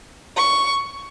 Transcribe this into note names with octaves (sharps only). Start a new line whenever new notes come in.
C#6